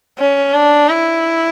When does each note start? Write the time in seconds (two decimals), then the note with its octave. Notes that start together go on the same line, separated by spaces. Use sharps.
0.19 C#4
0.54 D4
0.89 E4